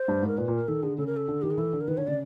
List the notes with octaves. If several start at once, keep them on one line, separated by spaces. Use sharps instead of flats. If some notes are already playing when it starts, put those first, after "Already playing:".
Already playing: C5
G2
G#2 A#4
A#2 B4
A#2
A#4
D#3 A4
D3 G#4
C#3 A4
A#4
A4
D3
D#3 G4
G#4
E3 A4
D3
A#4
D#3 B4
D3 C#5
C#3 D5